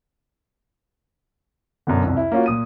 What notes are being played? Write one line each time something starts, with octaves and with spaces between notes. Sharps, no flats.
F#2 B2 D3
C2 F2
E4
A#3 C#4 F4 F#4
A#2 D#6 D#7